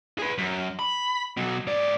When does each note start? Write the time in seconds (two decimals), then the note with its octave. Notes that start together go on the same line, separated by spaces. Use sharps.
0.19 G#4 B4
0.38 F#2
0.79 B5
1.37 B2 F#3
1.67 G#2 D5